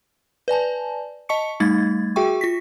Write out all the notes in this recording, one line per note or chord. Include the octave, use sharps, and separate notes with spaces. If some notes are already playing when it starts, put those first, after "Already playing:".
B4 D5 G#5 A5
D#5 A5 C#6 C#7
G3 A3 D#4 G#6 A6
F#4 G#4 E5 G5 C#6
F4 A#6 B6